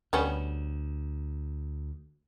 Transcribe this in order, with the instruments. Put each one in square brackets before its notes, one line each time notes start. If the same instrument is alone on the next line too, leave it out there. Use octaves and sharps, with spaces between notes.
[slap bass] D2 [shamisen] G3 B3 C#4